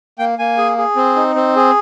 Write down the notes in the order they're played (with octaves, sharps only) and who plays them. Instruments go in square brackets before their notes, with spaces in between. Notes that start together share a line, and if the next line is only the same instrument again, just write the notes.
[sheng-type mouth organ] A#3 G5
A#3 G#5
G#4
G#4
C4
D#4
C4
G#4